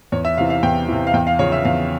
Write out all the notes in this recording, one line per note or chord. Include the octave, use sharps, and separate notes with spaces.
E2 C#5
E5
C3 E3 F5
F5
E2 G5
C3 E3
F5
E2 G5
F5
C#3 F3 C#5
E5
E2 F5